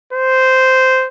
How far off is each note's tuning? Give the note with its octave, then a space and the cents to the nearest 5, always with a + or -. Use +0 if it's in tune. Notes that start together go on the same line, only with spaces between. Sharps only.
C5 -10